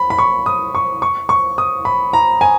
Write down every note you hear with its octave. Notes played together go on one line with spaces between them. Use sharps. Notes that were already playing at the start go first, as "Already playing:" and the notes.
Already playing: B5
B5
C#6
D#6
C#6
C#6
C#6
D#6
B5
A#5
G#5